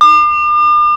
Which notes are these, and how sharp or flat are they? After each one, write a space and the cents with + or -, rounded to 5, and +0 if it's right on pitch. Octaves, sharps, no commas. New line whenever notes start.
D6 +40